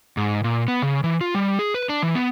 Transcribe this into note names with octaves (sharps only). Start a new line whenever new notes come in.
G#2
A#2
B3
C#3
E3
F4
G3
G#4
B4
D4
E3
B3